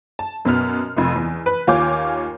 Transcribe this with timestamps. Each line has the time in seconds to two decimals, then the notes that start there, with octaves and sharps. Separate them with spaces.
0.19 A5
0.45 F#2 B2 B3 F6
0.96 F1 F2
1.16 E2
1.46 B4
1.67 D#2 F4 C#5 G#5 D6 G6